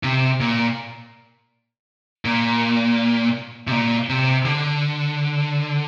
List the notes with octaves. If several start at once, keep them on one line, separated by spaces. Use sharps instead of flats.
C3
A#2
A#2
C3
A#2
C3
D3